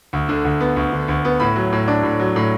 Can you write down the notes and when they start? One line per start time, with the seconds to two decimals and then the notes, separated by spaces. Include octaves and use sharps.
0.13 D2
0.29 D3
0.45 D2
0.61 B3
0.76 D2
0.92 D3
1.08 D2
1.25 B3
1.40 A2 B5
1.56 F#3
1.72 A2
1.88 D4
2.03 A2
2.20 F#3
2.36 A2